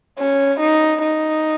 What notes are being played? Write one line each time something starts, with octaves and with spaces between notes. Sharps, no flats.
C#4
D#4
D#4